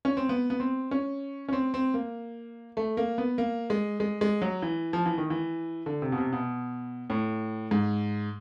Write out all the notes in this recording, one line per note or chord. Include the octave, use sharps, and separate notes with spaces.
C#4
C4
B3
B3
C4
C#4
C#4
C4
C4
A#3
A3
A#3
B3
A#3
G#3
G#3
G#3
F#3
E3
F3
E3
D#3
E3
D3
C3
B2
C3
B2
A2
G#2